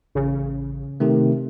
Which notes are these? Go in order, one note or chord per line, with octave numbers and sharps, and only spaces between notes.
A1 C#3
C3 D#3 A3